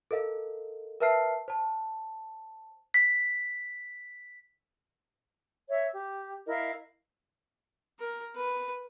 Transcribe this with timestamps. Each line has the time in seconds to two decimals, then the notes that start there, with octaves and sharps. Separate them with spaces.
0.11 A4 A#4 D#5 F5
1.00 A#4 B4 E5 A5 F6 C7
1.48 C5 A5
2.94 B6
5.69 C#5 E5
5.92 G4
6.48 E4 A#4 D#5 F5
7.99 A#4
8.36 B4